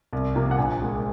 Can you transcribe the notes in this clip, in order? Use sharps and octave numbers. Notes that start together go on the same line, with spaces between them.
C2
C3 F3 A#3
F#5
A#1 G#5
A#2 G#3